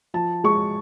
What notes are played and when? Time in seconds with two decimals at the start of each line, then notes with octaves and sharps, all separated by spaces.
0.14 F3 A5
0.44 G#3 C#6